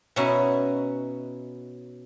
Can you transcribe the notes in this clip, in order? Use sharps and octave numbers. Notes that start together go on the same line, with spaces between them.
B2 C#4 D#4 E4 F#4